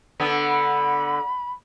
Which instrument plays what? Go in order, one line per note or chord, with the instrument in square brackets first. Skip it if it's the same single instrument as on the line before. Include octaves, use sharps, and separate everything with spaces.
[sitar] D3 B3
[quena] B5